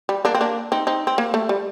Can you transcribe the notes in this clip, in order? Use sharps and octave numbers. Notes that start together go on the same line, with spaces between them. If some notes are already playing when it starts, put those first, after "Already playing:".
G3
A#3 D4
C4
A#3 D4
C4 D#4
C4 D#4
C4
A#3
A3
G3